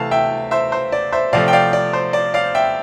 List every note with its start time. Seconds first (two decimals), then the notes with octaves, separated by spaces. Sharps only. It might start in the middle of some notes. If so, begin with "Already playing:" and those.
Already playing: C3 E3 A3 F5 A5
0.11 E5 G5
0.51 C5 E5
0.72 C5
0.92 D5
1.12 C5 E5
1.33 C3 F3 A3 D5 F5
1.48 G5
1.53 D5 F5
1.73 D5
1.93 C5
2.13 D5
2.34 D5 F5
2.55 E5 G5